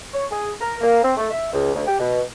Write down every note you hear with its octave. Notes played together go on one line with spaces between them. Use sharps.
C#5
G#4
A#4
A#3
C4
A3
E5
C#2
D2
G4
B2